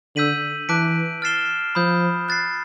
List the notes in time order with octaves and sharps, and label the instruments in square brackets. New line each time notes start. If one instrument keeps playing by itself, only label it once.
[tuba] D3 [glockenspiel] E6 G6 B6 D#7 F#7
[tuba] E3 [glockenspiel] A5 D6 F#6 B6 D7
[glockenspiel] F6 A6 C7 E7 G7
[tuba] F3 [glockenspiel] B5 D#6 G6
[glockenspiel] F#6 A6 C7